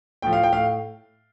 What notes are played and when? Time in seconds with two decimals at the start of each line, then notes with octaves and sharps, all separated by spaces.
0.22 A2 F3 G5
0.33 F5
0.43 G5
0.53 A2 F5